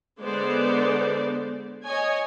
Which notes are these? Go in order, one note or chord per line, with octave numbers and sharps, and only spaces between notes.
D3 G#3 B3 C5 D5
C#5 D#5 G#5